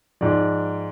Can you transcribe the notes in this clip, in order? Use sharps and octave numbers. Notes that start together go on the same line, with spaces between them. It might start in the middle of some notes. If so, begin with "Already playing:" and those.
G#2 F3 D5